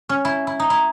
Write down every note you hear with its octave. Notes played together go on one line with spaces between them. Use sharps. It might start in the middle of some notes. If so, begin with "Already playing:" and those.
C#4
E4
E4
D#4
E4